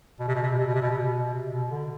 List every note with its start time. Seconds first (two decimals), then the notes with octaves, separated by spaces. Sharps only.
0.20 B2
0.28 C3
0.35 B2
0.43 C3
0.51 B2
0.59 C3
0.66 B2
0.74 C3
0.82 B2
0.90 C3
0.98 B2
1.33 C3
1.52 B2
1.71 D3